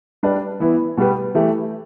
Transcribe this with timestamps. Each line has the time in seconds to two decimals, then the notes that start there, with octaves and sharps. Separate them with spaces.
0.23 G3 D4 B4 D5
0.60 E3 B3 E4
0.97 B2 G3 B3 G4 B4
1.35 E3 A3 G4